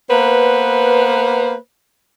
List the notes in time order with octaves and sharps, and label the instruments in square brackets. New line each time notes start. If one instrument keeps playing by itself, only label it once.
[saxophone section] A#3 B3 B4 C5